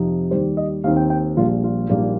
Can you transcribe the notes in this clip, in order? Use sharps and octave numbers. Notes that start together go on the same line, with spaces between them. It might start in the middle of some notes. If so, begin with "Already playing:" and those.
Already playing: F2 C3 F3 D#4
D#2 D#3 G3 C5
D#5
D#2 D#3 C4 D#4 F5
G5
G5
A#1 A#2 G3 F4
F4
A#1 A#2 G3 A#3 D#4